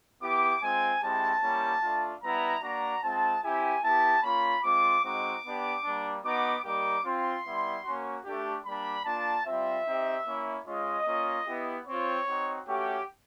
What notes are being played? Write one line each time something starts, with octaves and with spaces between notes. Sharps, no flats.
B3 E4 G4 D6
G#3 C4 F4 G#5
G#3 C4 E4 G4 A5
G3 A#3 C#4 E4 G4
A3 D4 F4
G3 B3 E4 A#5
A#3 D4 F#4 A#5
G#3 C4 F4 A5
C4 E4 G4 G#5
B3 E4 G4 A5
A#3 C#4 F4 B5
G#3 C4 F4 D6
G#3 C4 D#4 F#4 D6
B3 D4 G4
G3 A#3 D4
B3 D#4 F#4 D6
G3 A#3 D#4 G4 D6
C4 F4 C6
G3 B3 E4
A#3 C#4 F#4
A3 D4 G4
G3 A#3 D4 B5
A#3 D4 F4 A5
G3 C4 F4 E5
C4 D#4 G4
A#3 C#4 E4
G#3 C#4 F4 D#5
A#3 C#4 F4
B3 E4 G4
C4 F4 C#5
C4 D#4 F#4
A3 C#4 F#4 G4